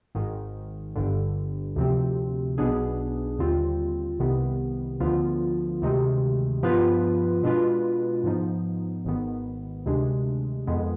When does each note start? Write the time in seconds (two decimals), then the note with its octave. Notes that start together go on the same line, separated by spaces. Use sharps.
0.15 G#1 G#2 D#3
0.96 G1 G2 D3
1.76 D2 C3 F3 C4
2.58 B1 B2 B3 D4 G#4
3.39 D#2 D3 G3 C4 F4
4.19 C2 C3 D#3 B3
5.00 D2 D3 F3 B3 F4
5.82 D2 C3 D#3 G#3
6.63 G2 F3 B3 F4 B4
7.43 B2 G#3 D4 F4 B4
8.24 G#2 F3 B3 D#4
9.05 G#1 G#2 D#3 B3
9.86 D2 C3 D#3 G#3 D4
10.67 F2 D#3 G#3 B3